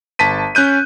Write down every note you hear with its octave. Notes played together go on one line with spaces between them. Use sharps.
G1 A5 B6 D#7
C#4 F#6 G6 D#7